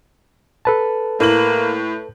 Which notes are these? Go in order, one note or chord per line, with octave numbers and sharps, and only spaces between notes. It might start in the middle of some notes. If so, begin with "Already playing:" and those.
A4 B4 A5
A2 A#3 F#7